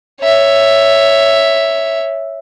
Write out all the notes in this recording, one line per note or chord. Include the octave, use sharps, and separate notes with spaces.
C#5 E5